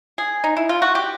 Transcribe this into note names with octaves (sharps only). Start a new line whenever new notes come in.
G#4
D#4
E4
F4
F#4
G4